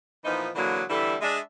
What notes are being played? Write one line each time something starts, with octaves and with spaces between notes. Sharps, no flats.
A#2 E3 F3 B3 D#4
D3 E3 F#3 G#3 A#3 D4
D3 E3 G3 A3 E4 A4
G#3 D4 E5